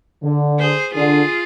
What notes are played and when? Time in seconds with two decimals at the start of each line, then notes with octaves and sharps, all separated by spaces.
0.23 D3
0.59 G#4 C5
0.95 D3 F4 G#4